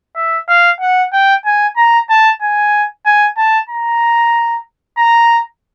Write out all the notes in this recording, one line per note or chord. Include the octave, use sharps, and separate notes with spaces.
E5
F5
F#5
G5
G#5
A#5
A5
G#5
G#5
A5
A#5
A#5